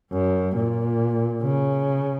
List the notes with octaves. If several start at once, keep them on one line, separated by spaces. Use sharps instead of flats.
F#2
A#2
C#3